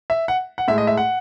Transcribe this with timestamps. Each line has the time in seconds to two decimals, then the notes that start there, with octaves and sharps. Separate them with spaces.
0.10 E5
0.28 F#5
0.58 F#5
0.68 A2 G#3 E5
0.78 D#5
0.87 E5
0.97 F#5